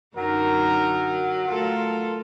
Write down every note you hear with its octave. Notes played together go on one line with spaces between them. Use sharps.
F#2 D3 F#3 D#4 A#4
A3 F4 A4 A#4